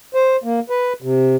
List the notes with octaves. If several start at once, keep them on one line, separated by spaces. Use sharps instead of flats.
C5
A#3
B4
C3